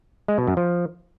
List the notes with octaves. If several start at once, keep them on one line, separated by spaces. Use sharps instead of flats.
G#3
B2
F#2
F3